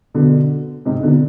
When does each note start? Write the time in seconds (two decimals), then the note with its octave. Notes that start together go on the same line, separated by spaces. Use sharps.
0.14 B2 D3
0.85 G#2 C3
1.03 B2 D3